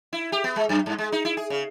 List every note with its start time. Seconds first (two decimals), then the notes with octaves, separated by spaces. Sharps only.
0.13 E4
0.32 G4
0.44 B3
0.56 G#3
0.69 F#2
0.86 G2
0.98 G#3
1.12 D#4
1.25 E4
1.37 G#4
1.50 C#3